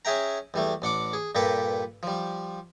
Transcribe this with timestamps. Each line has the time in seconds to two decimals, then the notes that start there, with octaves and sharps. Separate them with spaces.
0.05 C#4 G#4 E5 G5 A#5
0.54 E2 G3 A3
0.82 A1 D4 F#5 D6
1.13 G#4
1.35 G2 A#2 G4 A4 B4 G5
2.03 F3 G3